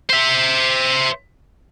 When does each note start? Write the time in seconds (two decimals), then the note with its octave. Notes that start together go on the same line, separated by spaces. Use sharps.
0.09 C5 E5